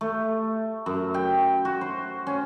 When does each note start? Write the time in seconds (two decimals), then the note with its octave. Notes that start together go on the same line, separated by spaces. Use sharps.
0.01 A3
0.86 F#2
1.14 G5
1.65 F#4
1.81 C5
2.27 C#4